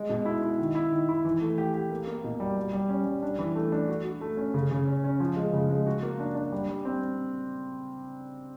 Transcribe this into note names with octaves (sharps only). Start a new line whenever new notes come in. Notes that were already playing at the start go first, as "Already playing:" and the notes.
Already playing: G#3
B2
E4
E4
D#3
E4
D#3
E4
E3
A3
G4
G4
A#3
A#3
B2
G3
G3
G3
C#4
G3
D4
E3
A3
D4
F#4
F#4
A3
C#4
C#3
C#3
C#4
C#4
F3
G#3
C#3
G#3
F#4
A#3
D4
D4
G3
G3
C4